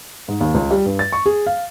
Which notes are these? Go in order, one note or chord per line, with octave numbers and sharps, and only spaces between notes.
G#2
D#2
C#2
G3
G2
A6
C#6
G#4
F5